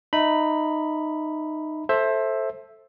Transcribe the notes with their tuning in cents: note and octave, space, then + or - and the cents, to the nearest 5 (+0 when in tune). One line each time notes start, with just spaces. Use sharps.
D#4 -15 E5 -25 B5 +0
A4 +0 C5 +20 E5 +0